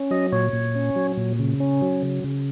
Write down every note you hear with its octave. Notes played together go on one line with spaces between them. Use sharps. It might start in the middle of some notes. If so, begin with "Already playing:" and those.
Already playing: C#4
F#3 D#5
A#2 C#5
A#2
C#4
F#3
A#2
C#3
C#4
F#3
C#3
C#3